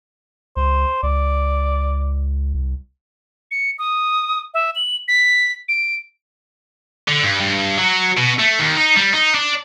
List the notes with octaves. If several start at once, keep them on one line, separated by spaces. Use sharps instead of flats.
C#2 C5
C#2 D5
C2
C#7
D#6
E5
F#7
B6
D7
D3
G2
G2
F#3
B2
A3
D#2
D#4
G3
D#4
D4